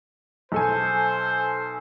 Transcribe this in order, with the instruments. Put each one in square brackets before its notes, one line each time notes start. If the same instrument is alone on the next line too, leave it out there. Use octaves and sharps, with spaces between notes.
[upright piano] B1 A4 G#5 [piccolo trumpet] C5